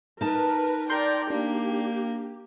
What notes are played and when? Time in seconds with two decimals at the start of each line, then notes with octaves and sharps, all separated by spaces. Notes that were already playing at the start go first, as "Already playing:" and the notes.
0.21 D#4 A#4 B4 A5
0.90 A#4 D5 G5 C6 G6
1.30 A#3 D4 G4